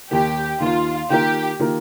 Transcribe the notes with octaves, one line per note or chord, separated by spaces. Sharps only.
D#2 D#3 A#3 G4
D#2 D#3 A#3 F4
D#3 A#3 F4 G4 A#4
D#3 A#3 F4 A#4